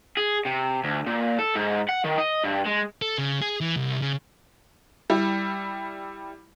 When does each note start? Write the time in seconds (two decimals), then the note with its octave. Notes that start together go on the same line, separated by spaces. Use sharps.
0.17 G#4
0.45 C3
0.84 D2
1.06 A#2
1.39 A4
1.55 G#2
1.89 F#5
2.04 D#3
2.18 D#5
2.44 G2
2.66 G#3
3.02 A4
3.18 C#3
3.41 G#4
3.61 E3
3.76 C2
4.01 C#3
5.10 G3 E4